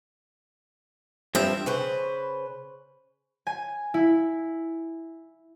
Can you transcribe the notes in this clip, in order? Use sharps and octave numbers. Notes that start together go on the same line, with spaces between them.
G2 F3 C4 E5
C#3 B4 C5
G#5
E4